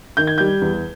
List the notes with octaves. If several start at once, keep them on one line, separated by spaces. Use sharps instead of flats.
D#3 G6
G#6
G3 G6
E2